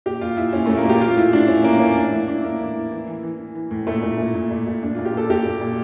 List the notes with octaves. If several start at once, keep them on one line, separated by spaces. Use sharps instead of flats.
A#2 G4
A#2 F4
A#2 E4
A#2 C#4
A#2 A3
A#3
A#2 G4
E3 F4
A2 E4
A2 D4
A2 C#4
E3 A#3
A2 C#4
A2 D4
E3 E4
A2 D4
A2 A#3
E3
E3
E3
E3
E3
E3
E3
A2
A#2 A3
A#2
A#2
A#2
A#2
A#2
A#2 D4
A#2 F4
G4
A#2 A4
A#2 G4
A#2
A#2